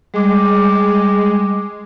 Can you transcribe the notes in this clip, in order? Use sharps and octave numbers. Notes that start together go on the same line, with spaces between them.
G3 G#3 D6